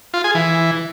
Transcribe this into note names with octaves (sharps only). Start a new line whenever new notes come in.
F4
G#4
E3